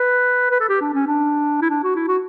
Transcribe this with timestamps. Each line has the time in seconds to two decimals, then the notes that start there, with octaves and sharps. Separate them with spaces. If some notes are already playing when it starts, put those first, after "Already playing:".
Already playing: B4
0.51 B4
0.61 A4
0.69 G4
0.81 D4
0.94 C#4
1.07 D4
1.62 E4
1.70 D4
1.84 F#4
1.95 E4
2.08 F#4